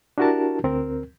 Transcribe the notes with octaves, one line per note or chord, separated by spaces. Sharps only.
D4 E4 F#4 G4 A#4 A5
D2 C4 A#4